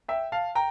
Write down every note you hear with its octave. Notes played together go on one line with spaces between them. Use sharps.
E5 G5
F5 A5
G5 A#5